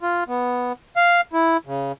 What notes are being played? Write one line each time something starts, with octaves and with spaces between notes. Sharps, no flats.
F4
B3
F5
E4
C#3